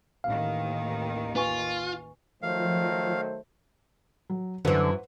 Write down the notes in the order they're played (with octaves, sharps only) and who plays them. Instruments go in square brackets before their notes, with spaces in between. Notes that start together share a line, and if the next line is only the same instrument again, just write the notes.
[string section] A1 D#2 D#3 [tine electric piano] F5
[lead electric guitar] F4 [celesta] B4 G#5 C#6
[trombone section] D#3 F#3 A3 [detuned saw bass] F3 [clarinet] C5 [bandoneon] F5
[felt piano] F#3
[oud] F#2 E3 [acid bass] D3 [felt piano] B4 C5 F#5